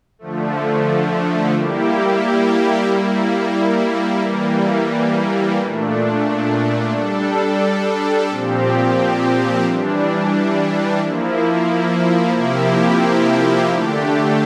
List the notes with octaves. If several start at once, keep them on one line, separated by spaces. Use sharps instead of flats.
D3 F3 A3
G3 A#3 E4 G4
G3 A#3 E4
E3 G3 A#3
A#2 A3 D4
G3 D4 A4
A#2 F3 C4 G4
E3 G3 D4
F3 A#3 E4
C3 F3 A#3 E4 G4
D3 A3 D4 G4